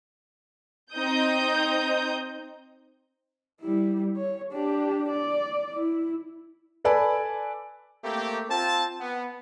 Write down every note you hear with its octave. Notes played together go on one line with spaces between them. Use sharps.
C4 D#4 D#6 G6
G3 E4
C#5
D4 G4
D5
E4
A4 B4 D5 G#5 A5 B5
A3 A#3 C4 G4
C4 F4 A5
B3